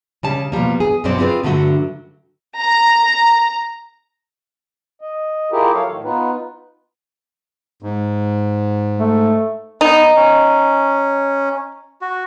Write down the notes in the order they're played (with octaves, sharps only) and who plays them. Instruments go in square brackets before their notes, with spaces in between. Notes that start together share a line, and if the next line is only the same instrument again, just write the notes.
[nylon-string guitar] C#3 G3 A5
B2 F3 G3 A#3
G#4
F#2 B2 F#3 C4 D5
C4 E4 F4 G#4 B4 D5
G2 D3 F#3 A3 F#4
[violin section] A#5
[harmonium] D#5
E4 F4 G4 G#4 A#4
F#3 A4 C#5 F5
A2 D#3
B3 D#4 F4 B4
[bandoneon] G#2
[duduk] A3
[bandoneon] B3 [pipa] D#4
[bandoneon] C#4
F#4